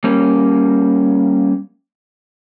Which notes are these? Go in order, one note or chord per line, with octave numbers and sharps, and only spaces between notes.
G3 A#3 C#4